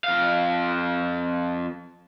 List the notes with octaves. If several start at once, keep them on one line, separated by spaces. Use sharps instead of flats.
F2 F5